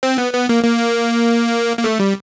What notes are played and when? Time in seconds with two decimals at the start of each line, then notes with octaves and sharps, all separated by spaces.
0.03 C4
0.18 B3
0.33 B3
0.49 A#3
0.64 A#3
1.78 A#3
1.84 A3
2.00 G3